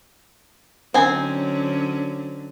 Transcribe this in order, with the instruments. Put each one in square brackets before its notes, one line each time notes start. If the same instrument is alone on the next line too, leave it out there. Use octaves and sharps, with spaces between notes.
[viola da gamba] D3 F#3 C#4 [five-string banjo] C4 D#4 G#5